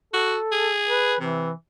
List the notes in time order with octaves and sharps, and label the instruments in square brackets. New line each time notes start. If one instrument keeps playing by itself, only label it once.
[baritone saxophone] F#4 [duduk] A4
[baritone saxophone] G#4
[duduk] B4
[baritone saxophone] C3 [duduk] E3